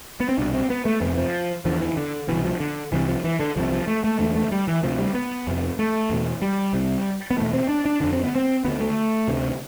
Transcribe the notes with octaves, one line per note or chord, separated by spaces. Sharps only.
B3
C4
C2 B2 D4
C4
B3
A3
F2 C3 B3
F3
E2 D3 F3
E3
D3
C2 B2 E3
F3
D3
C2 C3 E3
F3
E3
D3
C2 C3 F3
F3
A3
A3
E2 D3 A3
A3
G3
E3
D2 C3 F3
G3
B3
F2 C3
A3
E2 B2
G3
C2 C3
B3
E2 B2 A3
C4
D4
D4
F2 D3 D4
C4
B3
C4
D2 D3 B3
A3
D2 C3